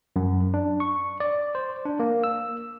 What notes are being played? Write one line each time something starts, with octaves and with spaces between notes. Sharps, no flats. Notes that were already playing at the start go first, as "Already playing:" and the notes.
F#2
D4
C#6
D5
C5
D4
A#3
E6